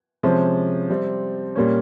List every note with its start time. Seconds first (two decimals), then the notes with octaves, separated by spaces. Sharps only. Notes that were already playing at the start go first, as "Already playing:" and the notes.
0.23 C3 F3 G#3 C#4
0.90 C3 G3 C4
1.56 A#2 G3 A#3 C#4